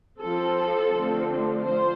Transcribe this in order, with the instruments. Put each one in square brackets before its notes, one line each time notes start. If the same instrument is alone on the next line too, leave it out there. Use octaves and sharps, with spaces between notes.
[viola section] F3 C4 A4
D3 F3 A3 C4
F3 C5